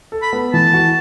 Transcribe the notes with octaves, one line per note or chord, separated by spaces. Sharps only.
A4
B5
B3
E3 A5
F#4